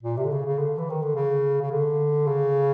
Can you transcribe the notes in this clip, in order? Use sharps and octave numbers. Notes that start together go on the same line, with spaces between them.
A#2
C3
D3
C#3
C#3
D3
E3
D#3
D3
C#3
C#3
D3
C#3